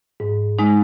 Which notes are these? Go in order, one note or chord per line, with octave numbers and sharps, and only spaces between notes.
G#2
G#3 D#4